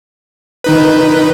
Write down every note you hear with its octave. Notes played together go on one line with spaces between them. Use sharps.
D#3 D#4 B4